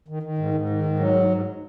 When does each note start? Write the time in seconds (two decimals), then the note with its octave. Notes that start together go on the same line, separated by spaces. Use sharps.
0.08 D#3
0.23 D#3
0.38 G#2
0.54 G#2
0.70 D#3
0.84 G#2
0.99 F#3
1.15 G#2
1.30 G#2